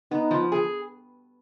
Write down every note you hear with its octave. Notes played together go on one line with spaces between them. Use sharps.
B3 D#4
F3
G#4